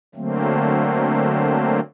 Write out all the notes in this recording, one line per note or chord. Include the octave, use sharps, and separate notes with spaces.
D3 F#3 A3 A#3 C4